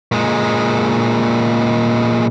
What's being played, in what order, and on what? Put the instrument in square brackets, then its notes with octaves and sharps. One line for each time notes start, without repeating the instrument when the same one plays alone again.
[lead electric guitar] A#2 G#3